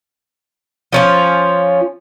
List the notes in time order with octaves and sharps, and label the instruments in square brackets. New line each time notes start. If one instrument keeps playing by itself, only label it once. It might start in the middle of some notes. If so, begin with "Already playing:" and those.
[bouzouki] F3 C#4 F4